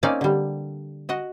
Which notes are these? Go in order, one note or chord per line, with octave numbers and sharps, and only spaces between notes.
A#3 C4 C#4 D#4 D5 F5
D3 G3
F#4 D#5 F#5